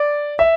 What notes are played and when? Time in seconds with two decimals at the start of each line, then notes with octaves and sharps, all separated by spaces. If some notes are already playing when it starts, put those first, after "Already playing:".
Already playing: D5
0.39 E5